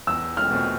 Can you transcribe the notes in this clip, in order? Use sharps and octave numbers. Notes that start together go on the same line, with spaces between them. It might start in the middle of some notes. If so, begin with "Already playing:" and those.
E2 E6
F6
B2 A3 C4